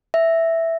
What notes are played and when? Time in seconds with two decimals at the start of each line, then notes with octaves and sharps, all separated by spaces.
0.14 E5